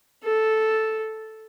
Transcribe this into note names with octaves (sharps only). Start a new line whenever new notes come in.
A4